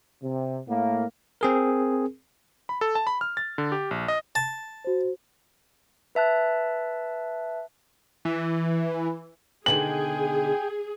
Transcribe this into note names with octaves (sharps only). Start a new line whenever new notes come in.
C3
A2 A#3
C4 G#4 A#4
B5
A4
A5
B5
F6
A6
D3
G4
A#1
D#5
A5
F#4 C5
B4 E5 A5 F#6
E3
B2 D3 D#3 G#4 G5 G#5 F#7